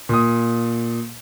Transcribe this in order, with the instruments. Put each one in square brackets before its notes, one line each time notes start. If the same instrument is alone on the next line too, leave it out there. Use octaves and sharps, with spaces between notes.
[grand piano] A#2 D#6